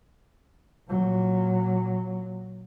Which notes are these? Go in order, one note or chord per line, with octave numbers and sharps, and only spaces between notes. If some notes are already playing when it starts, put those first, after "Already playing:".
A#2 F#3